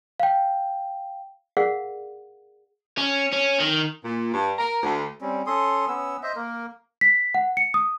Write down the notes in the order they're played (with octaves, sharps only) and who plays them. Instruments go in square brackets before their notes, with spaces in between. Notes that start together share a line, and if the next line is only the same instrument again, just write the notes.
[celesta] F5 G5
[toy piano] G#4 A#4 D5 F5 F#5
[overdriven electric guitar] C#4
C#4
D#3
[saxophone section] A#2
G2
A#4
D2
[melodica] G3 C4 C#4
C#4 A4 C6 D#6
B3 C#4 E6
C5 D#5 E5
A#3 A#4
[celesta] B6
F#5
C#7
D#6